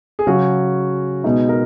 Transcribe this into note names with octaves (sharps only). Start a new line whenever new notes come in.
G#4
C#3 F#3 C#4 F#4
B2 G#3 D#4
A#4